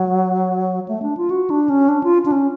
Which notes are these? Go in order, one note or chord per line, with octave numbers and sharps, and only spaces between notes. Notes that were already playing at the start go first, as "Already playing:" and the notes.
Already playing: F#3
A3
D4
F4
F#4
D4
C#4
D4
F4
D4
C#4